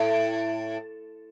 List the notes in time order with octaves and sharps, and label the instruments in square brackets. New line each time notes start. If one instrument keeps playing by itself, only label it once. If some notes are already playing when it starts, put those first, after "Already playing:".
Already playing: [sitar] A2